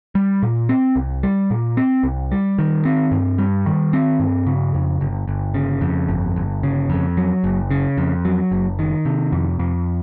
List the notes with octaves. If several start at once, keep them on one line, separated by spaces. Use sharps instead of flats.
G3
A#2
C4
C2
G3
A#2
C4
C2
G3
D#3
C4
G2
G3
D#3
C4
G2
C#3
F2
G1
G1
C#3
F2
G1
G1
C#3
F2
F#3
F#1
C#3
F2
F#3
F#1
D#3
C3
F2
F2